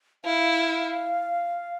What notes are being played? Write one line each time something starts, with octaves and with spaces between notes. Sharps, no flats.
E4 F5